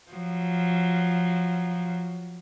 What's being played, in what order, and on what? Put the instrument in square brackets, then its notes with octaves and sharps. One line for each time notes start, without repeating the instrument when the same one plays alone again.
[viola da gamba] F3 F#3